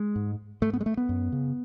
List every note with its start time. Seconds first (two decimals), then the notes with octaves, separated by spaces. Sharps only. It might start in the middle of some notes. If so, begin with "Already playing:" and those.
Already playing: G#3
0.16 G#2
0.62 G#2 A3
0.73 B3
0.81 G#3
0.86 A3
0.97 B3
1.09 F#2
1.32 C#3